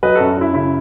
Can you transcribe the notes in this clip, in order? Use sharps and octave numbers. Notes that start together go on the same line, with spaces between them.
F#3 B4 D#5
F#2 F#4 A4
F#2 E4
C#3 E4